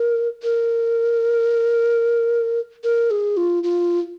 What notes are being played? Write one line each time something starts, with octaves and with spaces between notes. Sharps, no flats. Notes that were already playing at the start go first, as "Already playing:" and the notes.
Already playing: A#4
A#4
A#4
G#4
F4
F4